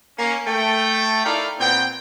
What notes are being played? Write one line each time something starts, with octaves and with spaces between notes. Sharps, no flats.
A#3 C#4
A3 G5
D#4 E4 A4 A#4 D5 F5
A#2 B3 C4 G5